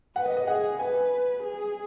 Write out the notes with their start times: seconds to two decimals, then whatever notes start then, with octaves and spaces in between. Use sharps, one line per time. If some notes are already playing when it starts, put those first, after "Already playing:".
0.16 B4 F#5
0.26 D#5
0.37 D#5
0.47 G#4 F#5
0.79 B4 G#5
1.43 G#4